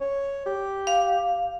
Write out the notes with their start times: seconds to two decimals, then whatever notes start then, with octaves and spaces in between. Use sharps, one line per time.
0.01 C#5
0.46 G4
0.87 F5